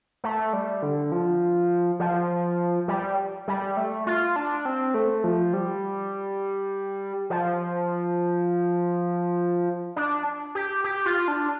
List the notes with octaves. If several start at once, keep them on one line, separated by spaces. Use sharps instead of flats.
A3
G3
D3
F3
F3
G3
G3
A3
F4
D4
C4
A3
F3
G3
F3
D4
G4
G4
F4
D4